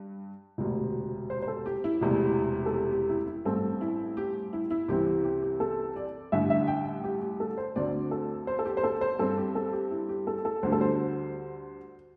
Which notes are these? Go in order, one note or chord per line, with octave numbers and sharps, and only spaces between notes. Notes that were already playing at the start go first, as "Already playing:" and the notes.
Already playing: G2
E1 D2 C3
C5
C5
A4
G4
E4
E1 E2 C3 A3
A4
G4
G4
E4
E4
A1 G2 G3 C4 A4
E4
G4
E4
E4
C2 C3 E3 C4 G4
G4
G4
G4
A4
D5
A1 G2 D3 E5
E5
G5
G4
G4
A4
C5
D2 D3 A3 C4 D5
A4
C5
A4
G4
C5
A4
C5
G2 G3 C4 A4
G4
A4
G4
E4
G4
A4
A4
D2 D3 G3 C5
A4
C5